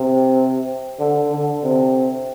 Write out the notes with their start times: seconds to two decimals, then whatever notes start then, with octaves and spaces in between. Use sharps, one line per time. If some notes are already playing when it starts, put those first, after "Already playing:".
Already playing: C3
1.00 D3
1.32 D3
1.64 C3